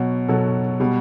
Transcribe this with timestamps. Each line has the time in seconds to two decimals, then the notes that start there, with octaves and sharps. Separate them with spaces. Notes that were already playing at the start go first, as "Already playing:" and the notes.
Already playing: B2 F#3
0.28 B2 F#3 A4
0.80 B2 G3